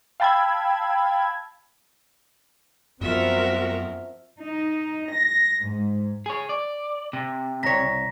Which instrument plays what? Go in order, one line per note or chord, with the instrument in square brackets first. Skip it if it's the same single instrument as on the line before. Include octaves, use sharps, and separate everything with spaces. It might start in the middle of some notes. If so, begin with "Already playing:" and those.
[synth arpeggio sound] F5 G5 A5 B5 E6 G#6
[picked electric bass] F#2 B3 [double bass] F3 C4 [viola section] F4 F#4 A#4 [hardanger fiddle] E5
[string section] D#4
A#6
G#2
[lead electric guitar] G#4 C#5
D5
C3
[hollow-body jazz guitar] C2 C#5 [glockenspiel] A#5 A#6 B6